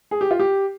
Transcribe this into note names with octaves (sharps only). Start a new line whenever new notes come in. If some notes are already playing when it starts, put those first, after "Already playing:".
G#4
G4
F4
G4